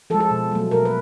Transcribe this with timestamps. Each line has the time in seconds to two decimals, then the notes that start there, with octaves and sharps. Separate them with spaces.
0.10 F3 A4
0.14 G#3
0.20 A4
0.31 B2
0.52 F#3 A3
0.71 B2 A#4
0.85 B4